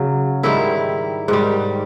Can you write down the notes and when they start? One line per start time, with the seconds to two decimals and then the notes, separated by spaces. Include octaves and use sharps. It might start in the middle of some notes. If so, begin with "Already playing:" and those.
Already playing: C#3 F#3
0.43 G#2 D#3 G3 E4
1.28 G#2 D#3 G3